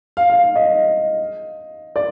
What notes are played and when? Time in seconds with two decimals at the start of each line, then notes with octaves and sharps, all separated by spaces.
0.17 F5
0.30 F5
0.56 D#5
1.96 D5